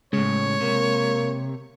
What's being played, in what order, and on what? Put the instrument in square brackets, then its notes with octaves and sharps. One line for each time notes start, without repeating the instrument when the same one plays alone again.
[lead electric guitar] A2 C#3 [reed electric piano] G#3 [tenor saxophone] C#5
[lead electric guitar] C3 [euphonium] A#3